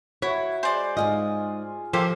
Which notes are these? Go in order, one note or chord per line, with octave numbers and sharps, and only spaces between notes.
E4 F#4 C#5
G#3 C5 D5 G#5
G#2 C3 F4 D#5 G#5
F3 A#3 G4 A4 C5 F5